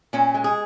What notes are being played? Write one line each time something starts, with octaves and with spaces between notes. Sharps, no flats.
A#2 C#4
G#3
G#4